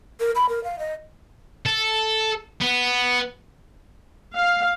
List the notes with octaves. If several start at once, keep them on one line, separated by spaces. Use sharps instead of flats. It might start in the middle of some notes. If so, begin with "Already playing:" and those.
A#4
B5
A#4
F5
D#5
A4
B3
F5